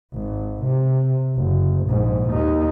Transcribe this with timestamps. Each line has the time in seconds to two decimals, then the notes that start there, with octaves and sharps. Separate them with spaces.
0.14 G#1
0.64 C3
1.36 F#1
1.86 A#1 G#2
2.30 D#2 D#4